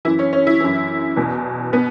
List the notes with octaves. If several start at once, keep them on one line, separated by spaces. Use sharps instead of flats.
F#2 E3 E4
C#4
C#4
E4
F#2 E3
E2 B2
B2 B3